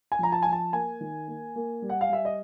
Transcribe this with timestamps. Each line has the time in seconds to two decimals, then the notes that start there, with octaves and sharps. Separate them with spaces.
0.12 G#5
0.19 F3 A#5
0.32 A5
0.42 F3 G#5
0.52 A5
0.73 A#3 G#5
1.01 D#3
1.28 A#3
1.56 A#3
1.82 G3
1.89 F#5
2.01 F5
2.09 G3 E5
2.25 D#5